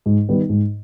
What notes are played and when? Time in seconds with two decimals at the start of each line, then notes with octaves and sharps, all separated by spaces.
0.06 G#2
0.29 D#3 G3 B3
0.49 G#2